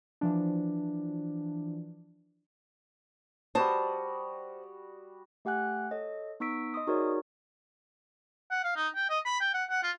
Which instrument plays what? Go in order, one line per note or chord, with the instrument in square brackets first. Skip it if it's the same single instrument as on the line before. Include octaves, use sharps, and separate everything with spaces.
[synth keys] E3 F3 D4
[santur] G3 F#4 D#6 [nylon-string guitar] C5 A5
[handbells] A3 G4 F#5 G#5 F#6
A4 C#5 D#5
B3 D#4 C#6 E6 B6 D7
D#5 C6 D#6
D#4 F#4 G#4 A#4 C#5 D5
[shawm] F#5
F5
D#4
G5
D#5
B5
G5
F#5
F#5
F4